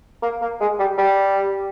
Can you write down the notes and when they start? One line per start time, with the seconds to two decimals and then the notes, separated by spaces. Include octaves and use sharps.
0.23 A#3
0.42 A#3
0.61 G#3
0.79 G3
0.98 G3